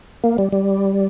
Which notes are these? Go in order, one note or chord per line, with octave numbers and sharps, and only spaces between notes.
A#3
G3
G3